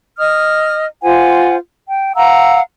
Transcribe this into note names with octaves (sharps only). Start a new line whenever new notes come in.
D#5 D#6 F6
F4 C5 F#5 G#5
G5
F5 F#5 A#5 E6